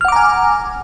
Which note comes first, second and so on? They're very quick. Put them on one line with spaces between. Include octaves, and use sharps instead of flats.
F6 F#5 D6 A#5 G#5